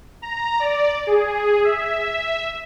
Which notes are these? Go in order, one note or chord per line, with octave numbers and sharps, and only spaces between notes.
A#5
D5
G#4
E5